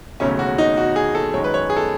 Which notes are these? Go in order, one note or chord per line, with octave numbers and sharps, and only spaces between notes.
E1 D#2 C#3 F#3 A3 C#4
F#4
D#4
F#4
G#4
A4
F#2 D#3 G#3 C#5
B4
C#5
G#4
A4